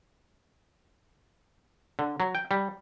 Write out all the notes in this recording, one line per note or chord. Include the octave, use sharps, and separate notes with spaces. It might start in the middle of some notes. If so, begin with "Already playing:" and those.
D3
F#3
G5
G3